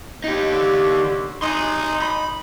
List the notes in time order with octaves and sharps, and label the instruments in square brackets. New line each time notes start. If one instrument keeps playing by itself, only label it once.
[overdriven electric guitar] D#4 G4
[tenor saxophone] D3
[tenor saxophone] D#4 [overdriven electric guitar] G#5 C6
[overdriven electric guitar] B5